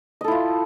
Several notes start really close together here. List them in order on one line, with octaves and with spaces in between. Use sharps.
D#5 A4 E4 F4